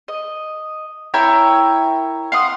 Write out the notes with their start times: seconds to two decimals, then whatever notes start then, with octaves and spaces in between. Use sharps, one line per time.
0.08 D#5
1.14 E4 A#4 C#5 G5
2.32 F5 F#5 C6 D#6